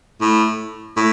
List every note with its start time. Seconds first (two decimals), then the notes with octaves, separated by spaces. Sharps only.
0.21 A2
0.97 A2